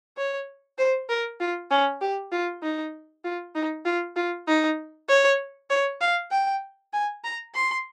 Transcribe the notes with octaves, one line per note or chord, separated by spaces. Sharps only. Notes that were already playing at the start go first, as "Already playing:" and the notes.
C#5
C5
A#4
F4
C#4
G4
F4
D#4
F4
D#4
F4
F4
D#4
C#5
C#5
F5
G5
G#5
A#5
C6